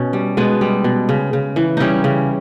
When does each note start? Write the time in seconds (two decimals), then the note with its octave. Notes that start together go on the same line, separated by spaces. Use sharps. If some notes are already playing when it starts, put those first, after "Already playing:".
Already playing: B2 C#4
0.13 G3
0.37 B2 G#3 B3
0.61 G3
0.84 B2
1.09 C#3
1.33 C#3
1.56 E3
1.77 G3 C#4 D#4 E4
2.04 C#3